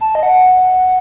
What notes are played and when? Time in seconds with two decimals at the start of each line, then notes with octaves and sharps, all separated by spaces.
0.01 A5
0.15 D#5
0.23 F#5